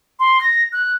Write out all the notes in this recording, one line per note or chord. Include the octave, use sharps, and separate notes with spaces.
C6
A#6
F#6